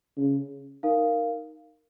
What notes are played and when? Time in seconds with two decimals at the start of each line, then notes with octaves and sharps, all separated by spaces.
0.18 C#3
0.83 D#4 A#4 F5